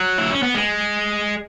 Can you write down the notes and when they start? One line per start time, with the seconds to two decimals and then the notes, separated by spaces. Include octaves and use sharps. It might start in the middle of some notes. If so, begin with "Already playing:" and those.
Already playing: F#3
0.18 E4
0.31 C#4
0.43 B3
0.55 G#3